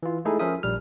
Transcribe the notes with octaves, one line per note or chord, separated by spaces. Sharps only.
E3 F4
G#3 A3 D#4 E4 G#4 A4
F3 C#4 A#4 C5 E5 D#6
A#1 G3 F6